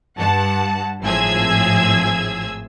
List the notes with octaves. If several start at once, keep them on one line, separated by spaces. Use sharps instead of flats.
G2 F#5 A5
G#1 A2 F3 G#4 E6 G#6